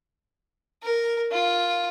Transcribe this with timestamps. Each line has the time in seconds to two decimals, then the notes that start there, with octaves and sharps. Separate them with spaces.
0.83 A#4
1.32 F4